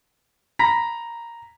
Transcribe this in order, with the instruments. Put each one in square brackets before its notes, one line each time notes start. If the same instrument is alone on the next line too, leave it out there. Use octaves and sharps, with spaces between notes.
[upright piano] A#5 B5 A#6 B6